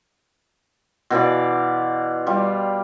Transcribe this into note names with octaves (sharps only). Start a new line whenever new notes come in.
B2 E3 F4 D5
G3 F4